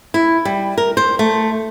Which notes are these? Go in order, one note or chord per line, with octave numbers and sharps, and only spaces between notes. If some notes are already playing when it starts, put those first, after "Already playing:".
E4
G3
A#4
C5
A3